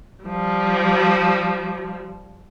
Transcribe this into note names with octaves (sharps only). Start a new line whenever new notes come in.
F3 G3